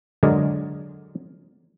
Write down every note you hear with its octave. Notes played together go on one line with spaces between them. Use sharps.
D3 F#3 G#3 G#4 A#4 D5